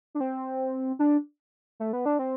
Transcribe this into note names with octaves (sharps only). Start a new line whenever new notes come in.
D4
C4
D4
A3
B3
D4
C4